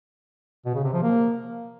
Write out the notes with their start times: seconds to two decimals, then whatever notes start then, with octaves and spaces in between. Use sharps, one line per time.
0.66 B2
0.75 C#3
0.84 C3
0.93 F3
1.02 A#3